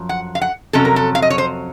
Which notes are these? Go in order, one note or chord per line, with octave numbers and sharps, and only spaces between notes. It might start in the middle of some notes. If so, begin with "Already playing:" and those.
Already playing: F#2 F3
F#5
F5
F#5
F2 C3 F#3 C#4 A4
A#4
A4
F5
D#5
C#5
C5